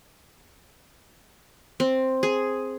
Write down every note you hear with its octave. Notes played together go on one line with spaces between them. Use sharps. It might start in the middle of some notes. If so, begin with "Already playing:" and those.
C4
G#4